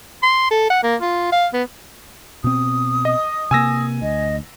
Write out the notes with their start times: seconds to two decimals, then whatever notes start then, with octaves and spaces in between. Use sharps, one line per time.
0.22 C6
0.51 A4
0.70 F#5
0.83 A#3
1.01 F4
1.32 F5
1.53 B3
2.44 B2 C4 D#6
3.05 D#5
3.51 C3 A#3 G#5 E6 A#6
4.02 D2 D#5